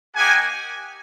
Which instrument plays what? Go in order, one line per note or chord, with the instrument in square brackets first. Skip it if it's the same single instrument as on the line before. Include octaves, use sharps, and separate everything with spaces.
[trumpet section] A#3 D#4 G4 F#5 G#5